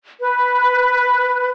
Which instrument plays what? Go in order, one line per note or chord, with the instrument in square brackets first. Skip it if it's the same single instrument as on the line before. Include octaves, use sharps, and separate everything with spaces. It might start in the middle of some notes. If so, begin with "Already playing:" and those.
[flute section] B4